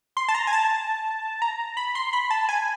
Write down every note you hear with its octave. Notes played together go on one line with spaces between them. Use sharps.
C6
A5
A#5
G#5
A5
A#5
B5
C6
B5
A5
G#5